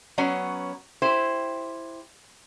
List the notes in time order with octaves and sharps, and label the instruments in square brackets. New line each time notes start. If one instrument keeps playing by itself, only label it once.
[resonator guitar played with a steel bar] F#3 B3 C#4 C#5
E4 G4 C5